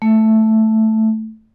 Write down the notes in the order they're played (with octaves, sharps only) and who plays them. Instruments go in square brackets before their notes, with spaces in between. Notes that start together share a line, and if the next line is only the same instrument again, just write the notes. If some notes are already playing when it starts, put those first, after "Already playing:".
[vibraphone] A3